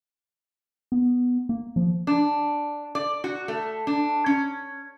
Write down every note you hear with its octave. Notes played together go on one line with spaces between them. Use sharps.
B3
A#3
F3
D4
D5
F#4
A3
D4
C#4